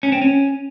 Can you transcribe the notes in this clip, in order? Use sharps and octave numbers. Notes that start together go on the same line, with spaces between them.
C#4
C4
C#4